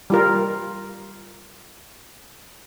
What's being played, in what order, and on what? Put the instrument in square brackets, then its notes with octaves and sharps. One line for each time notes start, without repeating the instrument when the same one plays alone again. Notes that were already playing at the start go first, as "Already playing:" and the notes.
[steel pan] G3 F4 A#4